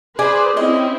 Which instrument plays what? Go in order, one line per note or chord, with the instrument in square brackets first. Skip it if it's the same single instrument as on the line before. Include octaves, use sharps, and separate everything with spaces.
[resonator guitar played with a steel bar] G#4 D5 [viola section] B4 C5
[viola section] C4 C#4 E4 [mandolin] D#5